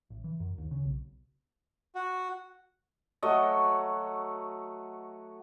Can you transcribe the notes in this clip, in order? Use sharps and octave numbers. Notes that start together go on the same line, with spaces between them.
A1
E3
F#2
D#2
C#3
B1
F#4
F#3 A3 F#4 D#5